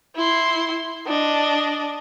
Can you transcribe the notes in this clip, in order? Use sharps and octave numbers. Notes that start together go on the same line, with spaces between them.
E4 C6
D4 D#5